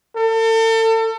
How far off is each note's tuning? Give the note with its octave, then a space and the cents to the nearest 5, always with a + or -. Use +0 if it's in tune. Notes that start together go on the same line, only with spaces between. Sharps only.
A4 +35